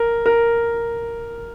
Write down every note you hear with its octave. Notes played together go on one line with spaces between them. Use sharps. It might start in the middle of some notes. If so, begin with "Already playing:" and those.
Already playing: A#4
A#4